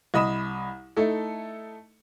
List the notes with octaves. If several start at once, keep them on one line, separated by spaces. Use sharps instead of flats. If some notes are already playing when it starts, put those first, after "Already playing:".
C2 D#5 B5 D#6 E7
A3 D#4 E4 A4